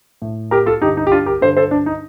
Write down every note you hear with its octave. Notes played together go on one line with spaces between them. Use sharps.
A2
G4 A#4
F4 A4
G2 D3 D#4 G4
D#4
G4
D4 F4
G4 A#4
G2 D3 A4 C5
A4 C5
D4
D#4